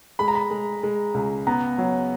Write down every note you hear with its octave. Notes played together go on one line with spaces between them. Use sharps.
G#3 B5
A#5
B5
G#3
G#3
C#2
B3 A#5
F#3